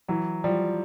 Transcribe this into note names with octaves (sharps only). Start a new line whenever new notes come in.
E3 F#3
F3 G3